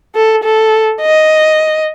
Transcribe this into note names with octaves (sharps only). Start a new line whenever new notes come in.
A4
A4
D#5